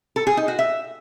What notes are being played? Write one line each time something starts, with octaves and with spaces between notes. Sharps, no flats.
A4
G#4
D#4
F#4
E5